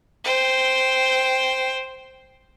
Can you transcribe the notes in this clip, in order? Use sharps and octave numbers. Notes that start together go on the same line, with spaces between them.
C5 G5